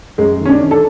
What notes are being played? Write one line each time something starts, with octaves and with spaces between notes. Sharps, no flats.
F#2 G#3
D#3
C#4
D4
D#3
A4